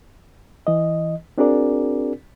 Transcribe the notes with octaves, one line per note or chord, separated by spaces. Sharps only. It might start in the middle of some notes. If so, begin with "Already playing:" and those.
E3 D#5
C4 D4 F#4 G#4 A#4 D5